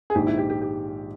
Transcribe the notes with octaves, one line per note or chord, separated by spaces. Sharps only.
G#4
A#1 G#2 D#3 G4
E4
G4
G4
G4